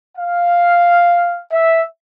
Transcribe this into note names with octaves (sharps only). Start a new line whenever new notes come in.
F5
E5